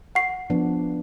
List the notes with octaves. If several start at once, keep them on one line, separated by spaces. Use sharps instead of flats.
F#5 C#6 C7
F3 B3 D4